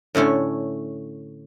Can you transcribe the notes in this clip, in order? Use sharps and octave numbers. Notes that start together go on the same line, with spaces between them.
A2 D3 A3 C#4